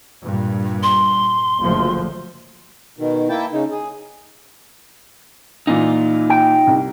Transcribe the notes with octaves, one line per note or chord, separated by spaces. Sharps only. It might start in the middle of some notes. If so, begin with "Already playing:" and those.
G2 A#2
C6
F#1 D2 F3
B2 D#3
A#3 E4 G5 A5
C#3 D#4
G#4
A#2 E3 D#4 F4
G5
C2